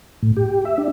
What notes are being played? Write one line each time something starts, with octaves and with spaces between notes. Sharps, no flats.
A2
G4
E5
D4